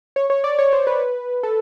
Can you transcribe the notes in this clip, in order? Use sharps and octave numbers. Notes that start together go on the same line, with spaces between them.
C#5
C#5
D5
C#5
C5
B4
A4